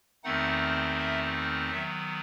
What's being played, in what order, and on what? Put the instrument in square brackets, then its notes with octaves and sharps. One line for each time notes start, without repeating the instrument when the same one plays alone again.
[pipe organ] E2 D#3 A3 C4 D#4 F#5
E5
D#3 F#3 B3 E5